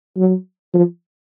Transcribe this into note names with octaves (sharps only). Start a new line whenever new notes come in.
F#3
F3